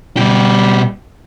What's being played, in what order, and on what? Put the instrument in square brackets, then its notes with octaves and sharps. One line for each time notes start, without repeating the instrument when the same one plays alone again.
[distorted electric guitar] B2 G4 [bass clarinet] G3